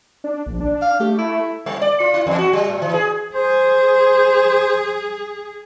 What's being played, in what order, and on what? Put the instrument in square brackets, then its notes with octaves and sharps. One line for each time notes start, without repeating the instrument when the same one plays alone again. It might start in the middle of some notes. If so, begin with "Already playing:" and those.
[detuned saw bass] D4
A#1
D4
[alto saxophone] F5
[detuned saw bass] A3 [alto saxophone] G4
[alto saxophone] E4
[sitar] G3
D5
F4
E4
E2
F#4
G3
A2
E3
G#4
[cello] G#4 [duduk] C5